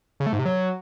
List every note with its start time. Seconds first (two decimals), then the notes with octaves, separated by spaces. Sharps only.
0.20 C#3
0.26 A3
0.33 G#2
0.39 C3
0.45 F#3